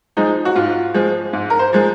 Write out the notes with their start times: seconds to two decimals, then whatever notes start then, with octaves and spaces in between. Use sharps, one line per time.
0.17 F3 G#3 D#4
0.45 F#4
0.55 G#2 F4
0.94 F3 G#3
1.33 G#2
1.50 A#4
1.59 C5
1.73 F3 G#3